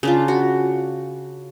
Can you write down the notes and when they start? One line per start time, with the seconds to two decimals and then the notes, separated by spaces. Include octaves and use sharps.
0.03 C#3 D4 F4
0.28 F#4